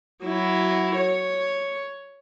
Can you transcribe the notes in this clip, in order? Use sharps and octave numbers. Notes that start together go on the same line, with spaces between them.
F#3 E4
C#5